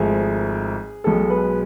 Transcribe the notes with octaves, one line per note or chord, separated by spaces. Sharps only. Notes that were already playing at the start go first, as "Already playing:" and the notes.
Already playing: G#1 G#2 F3 A3 G#4
B1 B2 G#3 A4
B4